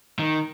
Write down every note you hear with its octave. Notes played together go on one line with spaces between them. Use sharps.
D#3